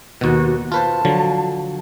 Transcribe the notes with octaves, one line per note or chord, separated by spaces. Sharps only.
D#2 B2 F#4
F4 B4 C5 A5
D3 F3 F#3